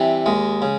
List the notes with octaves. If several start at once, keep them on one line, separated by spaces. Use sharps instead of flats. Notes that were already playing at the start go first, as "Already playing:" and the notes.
Already playing: C3 E3 G3
D#2 G#3
C#3